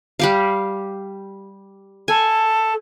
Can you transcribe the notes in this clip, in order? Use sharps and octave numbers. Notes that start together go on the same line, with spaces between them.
G3 G4 F5
A4 G#5